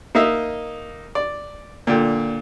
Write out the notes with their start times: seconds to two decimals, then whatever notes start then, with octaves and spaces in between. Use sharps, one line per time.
0.15 A#3 D#4 D#5 E5
1.15 D5
1.87 A#2 D3 G5